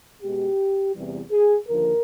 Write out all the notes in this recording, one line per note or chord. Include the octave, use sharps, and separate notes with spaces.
B2 G#3 G4
E2 C3 E3 G3
G#4
D#2 D3 F3 A#4